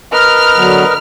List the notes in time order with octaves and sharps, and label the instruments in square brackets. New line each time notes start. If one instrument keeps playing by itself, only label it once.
[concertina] A#4 B4 D#5 [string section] F6
[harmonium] D3 F#3 B3